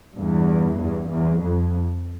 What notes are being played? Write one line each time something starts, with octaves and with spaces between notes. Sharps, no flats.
E2 G2
E2 G2
E2
F2